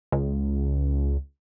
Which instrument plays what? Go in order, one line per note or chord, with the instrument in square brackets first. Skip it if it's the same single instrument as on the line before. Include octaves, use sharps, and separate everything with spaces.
[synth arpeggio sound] C#2